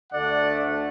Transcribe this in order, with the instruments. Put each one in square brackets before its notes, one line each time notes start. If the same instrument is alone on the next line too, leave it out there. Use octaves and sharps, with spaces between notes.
[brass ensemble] D2 D3 A3 D5 F#5